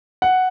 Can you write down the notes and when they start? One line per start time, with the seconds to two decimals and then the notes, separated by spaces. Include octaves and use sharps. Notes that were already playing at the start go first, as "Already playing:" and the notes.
0.22 F#5